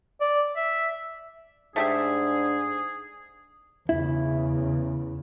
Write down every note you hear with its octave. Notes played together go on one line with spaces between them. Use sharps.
D5
E5
G#2 A3 D4 G4 G#4 E5
E2 C#3 E4